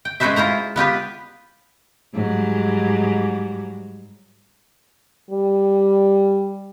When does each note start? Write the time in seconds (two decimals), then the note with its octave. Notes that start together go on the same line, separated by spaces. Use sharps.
0.05 G5
0.20 G#3 C#4 F#4 B4 C5 E5
0.36 E4 F4 C5 A#5
0.76 B3 F4 G4 B4
2.14 G#2 F#3 G3
5.30 G3